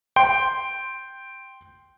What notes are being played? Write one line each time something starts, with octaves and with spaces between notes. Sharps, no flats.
G5 C6